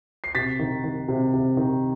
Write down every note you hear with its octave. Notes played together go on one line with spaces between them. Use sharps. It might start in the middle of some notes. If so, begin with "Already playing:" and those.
C7
C3 A6 B6
D#3
D#3
C3
C3
D#3